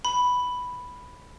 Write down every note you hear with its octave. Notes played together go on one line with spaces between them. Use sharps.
B5